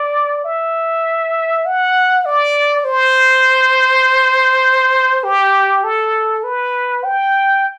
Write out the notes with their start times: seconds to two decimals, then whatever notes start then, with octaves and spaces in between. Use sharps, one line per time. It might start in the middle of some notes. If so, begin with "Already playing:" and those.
Already playing: D5
0.44 E5
1.65 F#5
2.25 D5
2.84 C5
5.24 G4
5.84 A4
6.44 B4
7.04 G5